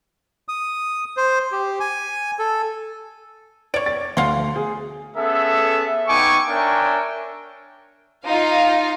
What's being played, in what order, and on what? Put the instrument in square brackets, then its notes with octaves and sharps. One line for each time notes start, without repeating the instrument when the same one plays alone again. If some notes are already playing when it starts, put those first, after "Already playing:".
[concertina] D#6
C5
G4
G#5
A4
[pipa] C#5 D5 [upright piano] D7
[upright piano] A6
[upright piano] D2 [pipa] F5 F#5 C6
[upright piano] G#4
[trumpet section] B3 C#4 G#4 A4 E5
B3 D#4 G5 G#5 C#6 D6
D4 A#4 C#5 E5 G5 G#5
[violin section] D#4 F4 F5